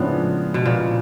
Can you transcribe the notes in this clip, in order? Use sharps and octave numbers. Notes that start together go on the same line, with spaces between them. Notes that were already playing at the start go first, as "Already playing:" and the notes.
Already playing: A2 C#3 F3 G#3 B3 D4
B2
A#2